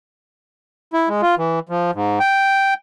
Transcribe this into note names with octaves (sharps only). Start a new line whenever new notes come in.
E4
G#3
F4
E3
F3
G#2
G5